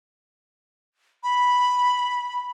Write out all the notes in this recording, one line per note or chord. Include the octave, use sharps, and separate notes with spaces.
B5